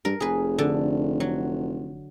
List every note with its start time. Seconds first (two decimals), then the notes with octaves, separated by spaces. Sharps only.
0.05 G2 A#4
0.20 F1 G#4 B4
0.58 D3
1.20 F#3